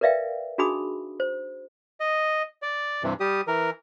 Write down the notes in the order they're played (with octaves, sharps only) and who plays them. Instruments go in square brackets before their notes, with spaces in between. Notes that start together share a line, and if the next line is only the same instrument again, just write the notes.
[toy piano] A#4 B4 D5 E5 F5 G5
D4 D#4 F#4 G#4 B5 D#6
C5
[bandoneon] D#5
D5
G2 C3 E3
G3 G4 D#6
E3 A#4